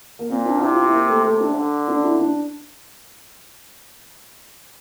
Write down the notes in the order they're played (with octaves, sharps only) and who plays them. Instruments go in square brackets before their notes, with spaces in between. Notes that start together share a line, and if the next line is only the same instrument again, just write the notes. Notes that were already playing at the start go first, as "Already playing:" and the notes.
[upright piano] A#3
[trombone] A#2 [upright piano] C4
[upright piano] D4
[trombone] C3 [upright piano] E4
[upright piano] F4
E4
A#3
A3
[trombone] C3 [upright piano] A3
[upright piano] D4
[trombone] D3
[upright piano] D4
E4
D4